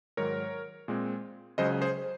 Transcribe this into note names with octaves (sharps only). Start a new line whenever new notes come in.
G#2 D#3 F#3 A#4 C#5
A#2 G#3 C4
C#2 C#3 F#3 C#4 C5 D#5
G#4 C5